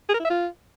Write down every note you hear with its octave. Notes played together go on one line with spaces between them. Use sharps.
G#4
A#4
E4
E5
F4